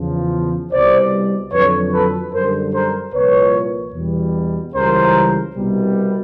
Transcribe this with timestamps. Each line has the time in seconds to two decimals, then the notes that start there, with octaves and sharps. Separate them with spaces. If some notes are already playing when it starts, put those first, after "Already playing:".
Already playing: E2 C#3 F3
0.72 C2 B2 G3 C5 D5
1.52 F2 D3 F#3 B4 C#5
1.92 A4 B4
2.33 F#2 D3 G3 A#4 C5
2.73 A#4 C5
3.13 C2 A#2 F3 B4 C#5
3.94 E2 B2 G3
4.73 C#2 C#3 E3 G3 A#4 C5
5.55 C2 B2 G3